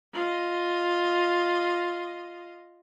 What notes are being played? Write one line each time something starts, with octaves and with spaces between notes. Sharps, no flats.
F4 D#5